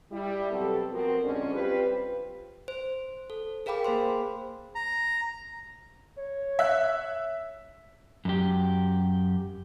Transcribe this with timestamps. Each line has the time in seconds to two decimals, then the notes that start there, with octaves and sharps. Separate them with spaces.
0.11 G3 E4
0.51 B2 F#3 C4 G4 A4
0.91 F3 B3 C4 F#4 A#4
1.23 F2 D3 G#3 C#4 D4
1.53 G3 C4 F4 G4 B4
2.68 C5
3.30 A4
3.66 G#4 A#4 F5 G5 B5 D6
3.84 A#3 G#4 C5 C6
4.75 A#5
6.18 C#5
6.59 E5 F#6
8.25 F#2 G4